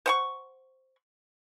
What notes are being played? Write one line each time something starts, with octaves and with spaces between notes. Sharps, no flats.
C5 F#5 C#6